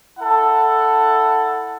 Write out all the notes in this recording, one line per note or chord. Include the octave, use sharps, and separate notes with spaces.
E4 A4 F#5